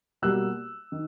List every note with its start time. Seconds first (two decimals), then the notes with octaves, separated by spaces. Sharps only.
0.22 B2 G3 A#3 E6 F#6
0.92 D#3